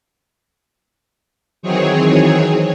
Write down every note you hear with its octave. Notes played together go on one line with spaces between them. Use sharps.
D#3 E3 F#3 C4 G#4 C#5